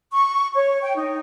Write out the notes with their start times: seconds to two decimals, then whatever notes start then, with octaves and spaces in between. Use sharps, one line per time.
0.12 C#6
0.54 C#5
0.81 G5
0.95 D#4